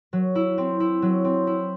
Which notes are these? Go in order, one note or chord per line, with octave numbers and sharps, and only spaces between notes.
F#3
E4
C4
E4
F#3
C4
E4